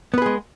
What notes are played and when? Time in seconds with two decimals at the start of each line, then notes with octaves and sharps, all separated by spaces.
0.14 B3
0.18 B4
0.22 G#4
0.26 G#3